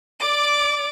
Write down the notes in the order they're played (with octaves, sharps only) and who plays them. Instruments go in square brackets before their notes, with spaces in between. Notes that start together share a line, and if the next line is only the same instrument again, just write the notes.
[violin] D5 D6